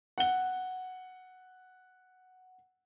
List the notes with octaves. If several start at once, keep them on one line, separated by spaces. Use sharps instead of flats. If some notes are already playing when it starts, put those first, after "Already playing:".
F#5 G7